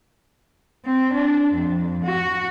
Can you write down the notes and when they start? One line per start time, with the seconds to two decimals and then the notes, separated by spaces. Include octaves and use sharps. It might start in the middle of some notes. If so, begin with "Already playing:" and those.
0.85 C4
1.14 D4
1.53 F2
2.04 F#4